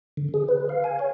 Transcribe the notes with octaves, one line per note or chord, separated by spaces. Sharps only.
D3
G#4
B4
F5
G#5
C#5